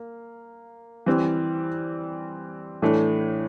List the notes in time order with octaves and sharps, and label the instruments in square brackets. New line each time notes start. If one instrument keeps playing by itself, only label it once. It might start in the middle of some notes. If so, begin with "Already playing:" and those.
Already playing: [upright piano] A#3
E3 G3 C4
A2 E3 A3 D4